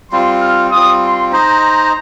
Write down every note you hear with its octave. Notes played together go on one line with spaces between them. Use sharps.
G3 C4 F4 C6
F6
G3 C4 F4 D#6
C6
D#4 C5 D#5 A#5